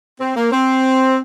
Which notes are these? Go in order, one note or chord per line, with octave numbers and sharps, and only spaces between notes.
C4
A#3
C4